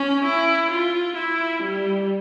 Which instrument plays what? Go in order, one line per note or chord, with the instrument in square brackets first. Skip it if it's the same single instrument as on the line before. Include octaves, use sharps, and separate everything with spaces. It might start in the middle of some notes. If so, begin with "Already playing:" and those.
Already playing: [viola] C#4
E4
F4
E4
G3